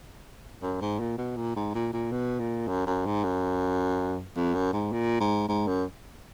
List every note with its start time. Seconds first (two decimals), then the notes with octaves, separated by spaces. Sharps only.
0.62 F#2
0.81 G#2
1.00 A#2
1.18 B2
1.37 A#2
1.56 G#2
1.75 A#2
1.93 A#2
2.12 B2
2.39 A#2
2.68 F#2
2.86 F#2
3.06 G#2
3.24 F#2
4.36 F2
4.54 F#2
4.73 G#2
4.92 A#2
5.20 G#2
5.48 G#2
5.67 F#2